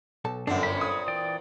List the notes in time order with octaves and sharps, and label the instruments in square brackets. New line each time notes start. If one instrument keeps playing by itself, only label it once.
[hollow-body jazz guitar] B1 A4 A5
[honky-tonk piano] G1 F#2 [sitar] A#2 C4 [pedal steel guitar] D4 [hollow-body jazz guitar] A4 F#5
[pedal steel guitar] C#5 B5
[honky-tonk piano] D#6
[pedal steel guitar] E3 D5 G5